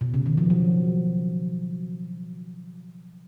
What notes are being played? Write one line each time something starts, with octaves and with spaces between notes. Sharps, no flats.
B2
C#3
D#3
F3
F#3